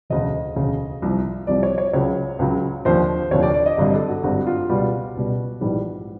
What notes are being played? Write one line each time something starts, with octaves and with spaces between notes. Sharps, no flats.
E1 D2 C#3 D#5
E1 D2 C#3
C2 C3 F3
C2 C3 F3 D5
C#5
C#5
C#2 C#3 F#3 C#5
C#2 C#3 F#3
F1 D#2 D3 F3 C5
F1 D#2 D3 F3 C#5
D5
D5
D#5
G#1 G2 D3 G3 D#5
A4
F#4
G#1 G2 D3 G3 F#4
F4
C#2 B2 G3 F#4
C#2 B2 G3
A#1 G#2 E3 G3